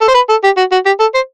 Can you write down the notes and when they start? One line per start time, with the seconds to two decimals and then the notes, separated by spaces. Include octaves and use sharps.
0.01 A4
0.08 C5
0.14 B4
0.29 A4
0.43 G4
0.57 F#4
0.71 F#4
0.86 G4
1.00 A4
1.14 C5